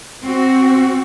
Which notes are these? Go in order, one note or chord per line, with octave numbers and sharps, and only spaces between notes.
C4 F#4